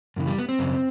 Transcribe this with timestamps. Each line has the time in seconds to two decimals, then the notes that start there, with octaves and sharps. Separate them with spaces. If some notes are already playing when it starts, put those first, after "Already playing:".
0.16 F#2 C#3 E3
0.27 G3
0.39 B3
0.49 C4
0.59 F#2 C#3